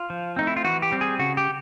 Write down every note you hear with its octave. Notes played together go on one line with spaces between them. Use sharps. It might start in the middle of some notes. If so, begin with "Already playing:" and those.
Already playing: F4
F3
A3 C4 D#4
E4
F4
E3 F#4
G4
G3 C4
G#4
C#3 F#4
G4